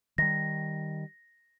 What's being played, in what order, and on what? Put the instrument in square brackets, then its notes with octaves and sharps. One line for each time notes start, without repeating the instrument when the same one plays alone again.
[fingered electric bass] D#3 G3 [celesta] A#6